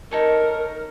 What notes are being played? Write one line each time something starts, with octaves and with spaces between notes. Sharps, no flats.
D#4 A4 A#4 C#5